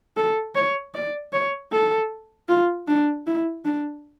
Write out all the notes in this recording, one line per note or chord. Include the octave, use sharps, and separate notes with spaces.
A4
C#5
D5
C#5
A4
F4
D4
E4
D4